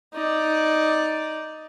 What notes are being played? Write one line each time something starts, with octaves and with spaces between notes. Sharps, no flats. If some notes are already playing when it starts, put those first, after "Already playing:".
D#4 D5